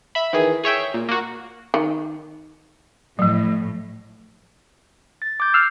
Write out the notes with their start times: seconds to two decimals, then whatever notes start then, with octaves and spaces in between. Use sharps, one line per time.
0.15 E5 B5
0.33 D#3 E3 G#4
0.64 G#4 C#5 E5 G5
0.94 A#2
1.09 A#3 F#4
1.74 D#3
3.19 A2 F3 F#3
5.22 A6
5.40 D6 G6
5.54 E6 F6 C7